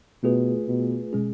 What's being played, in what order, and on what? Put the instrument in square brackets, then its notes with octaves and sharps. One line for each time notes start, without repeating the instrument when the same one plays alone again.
[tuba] B2 [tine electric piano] A3 F4 G#4 B4
[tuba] B2
[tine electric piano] B2 G#3 C#4 G#4